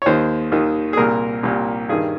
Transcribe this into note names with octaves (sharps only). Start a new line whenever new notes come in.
C#5
D#2 D#3 C5
D#2 D#3
G#4
C2 A#2 A#4
C2 A#2
G2 D#3 G#4